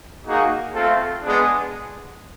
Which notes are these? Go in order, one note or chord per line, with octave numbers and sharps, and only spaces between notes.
A#3 D#4 F#4 G#4
A3 C4 F4 A4
G#3 B3 D4 G#4